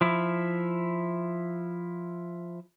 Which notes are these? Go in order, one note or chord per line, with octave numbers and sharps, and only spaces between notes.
F3 E4